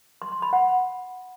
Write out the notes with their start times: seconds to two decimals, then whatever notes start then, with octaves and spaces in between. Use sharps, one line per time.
0.22 C6
0.32 C6
0.42 B5
0.53 F#5